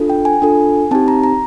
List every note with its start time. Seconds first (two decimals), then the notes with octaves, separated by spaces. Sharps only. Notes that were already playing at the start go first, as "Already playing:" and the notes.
Already playing: D4 F4 A4
0.10 G5
0.25 G#5
0.42 D4 F4 A4
0.91 C4 D#4 G4 A5
1.08 A#5
1.24 A#5